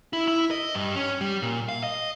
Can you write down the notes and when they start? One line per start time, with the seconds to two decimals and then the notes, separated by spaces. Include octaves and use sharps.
0.13 E4
0.28 E4
0.51 D#5
0.75 G2
0.96 C#4
1.21 G3
1.42 A#2
1.69 F5
1.83 D#5